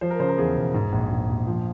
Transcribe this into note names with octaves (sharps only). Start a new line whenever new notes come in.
F3 C5
A#4
C#3 C5
A#4
E2 G#4
E1
G#2
A#1
A#1
A#1
F3